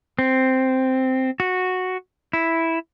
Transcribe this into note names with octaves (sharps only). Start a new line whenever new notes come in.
C4
F#4
E4